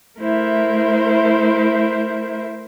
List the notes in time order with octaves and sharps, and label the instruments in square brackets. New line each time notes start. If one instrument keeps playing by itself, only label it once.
[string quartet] A3 E4 A#4 C5 E5